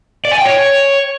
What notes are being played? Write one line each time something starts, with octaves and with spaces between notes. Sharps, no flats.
D5
G#5
G5
C#5